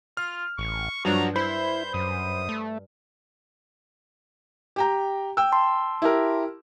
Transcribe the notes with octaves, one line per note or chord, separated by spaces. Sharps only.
F4 F6
A1 C#6
G2 F3 F#3 D4 F#4 A#5
E4 C5 B5 G6
F#2 D#6
A3
G4 G5 A#5
G5 E6
A5 C6
E4 G4 A#4